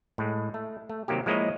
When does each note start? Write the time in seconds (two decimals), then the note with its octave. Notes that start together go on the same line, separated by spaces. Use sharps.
0.18 A2 G#3
0.54 A3
0.90 A3
1.08 C3 D#3 F#3 A#3 G4
1.26 F3 G#3 A#3 E4 C#5 D#5